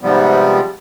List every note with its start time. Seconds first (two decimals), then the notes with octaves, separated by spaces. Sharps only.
0.01 G#2 C3 F3 G3 B3